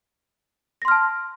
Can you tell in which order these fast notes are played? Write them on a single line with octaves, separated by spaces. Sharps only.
A#6 C6 F6 A5